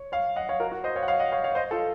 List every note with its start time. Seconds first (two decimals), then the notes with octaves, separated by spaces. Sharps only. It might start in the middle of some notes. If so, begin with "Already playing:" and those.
Already playing: C#5
0.12 C#5 F5
0.36 D#5 F#5
0.49 C#5 F5
0.60 F#4 A#4
0.72 F#4
0.84 C5 D#5
0.96 C#5 F5
1.03 F#5
1.08 C#5 F5
1.20 D#5 F#5
1.32 C#5 F5
1.44 C#5 F5
1.55 C5 D#5
1.71 F4 A4